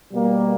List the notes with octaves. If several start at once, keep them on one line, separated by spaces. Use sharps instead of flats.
B2 G3 A#3